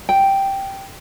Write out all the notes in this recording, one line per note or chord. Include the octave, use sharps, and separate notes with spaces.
G5